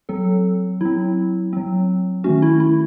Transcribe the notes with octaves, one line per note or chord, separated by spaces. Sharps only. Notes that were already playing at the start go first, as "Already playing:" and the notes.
F#3 C4 A4
F#3 C4 E4
F#3 C4
D#3 A3 C#4 F#4
E4
E4